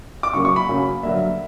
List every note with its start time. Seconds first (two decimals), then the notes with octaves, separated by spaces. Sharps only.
0.23 D6
0.33 F#2 C#3 F#3 A#3 C#6
0.45 C#6
0.56 B5
0.68 F#2 C#3 F#3 A#3
1.03 G2 D3 F#3 A#3 E5